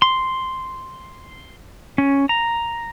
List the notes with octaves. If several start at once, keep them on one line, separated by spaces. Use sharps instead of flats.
C6
C#4
A#5